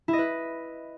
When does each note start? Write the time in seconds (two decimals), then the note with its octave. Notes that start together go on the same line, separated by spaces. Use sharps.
0.08 E4
0.13 D#5
0.18 B4